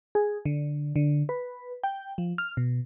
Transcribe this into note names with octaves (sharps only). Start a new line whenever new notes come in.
G#4
D3
D3
B4
G5
F3
F6
B2